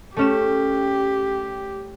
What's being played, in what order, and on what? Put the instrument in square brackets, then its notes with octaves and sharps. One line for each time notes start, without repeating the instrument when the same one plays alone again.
[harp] A3 C#4 E7 [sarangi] G4